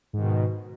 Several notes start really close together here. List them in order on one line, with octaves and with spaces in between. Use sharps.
G#2 D#3 B2